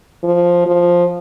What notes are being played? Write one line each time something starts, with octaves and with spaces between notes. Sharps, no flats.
F3
F3